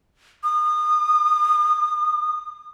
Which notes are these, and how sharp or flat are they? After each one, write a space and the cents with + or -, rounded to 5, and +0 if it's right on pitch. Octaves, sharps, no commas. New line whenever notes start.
D#6 -30